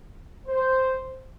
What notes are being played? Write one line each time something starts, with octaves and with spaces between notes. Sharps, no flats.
C5